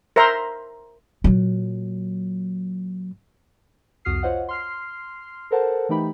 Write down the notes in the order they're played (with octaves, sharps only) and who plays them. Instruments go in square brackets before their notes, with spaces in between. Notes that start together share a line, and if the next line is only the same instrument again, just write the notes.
[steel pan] A#4 C5 E5 A#5 C6
[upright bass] A#2 F#3
[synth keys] C2 F2 F#4 D#6 F6 C7
F4 C5 C#5 D#5 F#5
C6 F6 C7
A4 A#4 C5 F#5 A5
E3 A3 D#4 G4 G5 B5